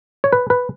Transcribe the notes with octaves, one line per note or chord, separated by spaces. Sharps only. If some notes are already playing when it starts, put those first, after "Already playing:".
C#5
B4
B4